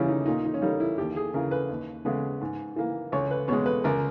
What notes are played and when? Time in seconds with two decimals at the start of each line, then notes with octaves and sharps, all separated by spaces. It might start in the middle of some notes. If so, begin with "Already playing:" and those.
Already playing: D#2 C#3 E3 G3 C#4 E4
0.08 D#4
0.26 A#2 D#4
0.44 D#4
0.54 C#4
0.62 G3 A#3 D#4
0.80 E4
0.98 D#2 G4
1.16 G#4
1.34 C#3 E3 A#4
1.51 B4
1.69 D#2
2.05 C#3 G#3 B3
2.41 G#2
2.76 E3 A#3
3.12 C#2 C#5
3.31 B4
3.48 B2 G#3 C#5
3.66 B4
3.84 C#2 A#4